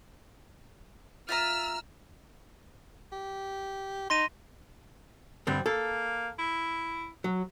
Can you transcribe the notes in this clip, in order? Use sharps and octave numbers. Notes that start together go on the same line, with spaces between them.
F4 E5 A#5 E6 F6
G4
D#4 C6 A#6 D#7
G2 D3 G3 C4
A#3 A4
E4
F#3